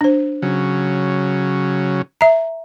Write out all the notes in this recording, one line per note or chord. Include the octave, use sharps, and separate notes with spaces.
D4 C5
C#3 F#3
E5 A#5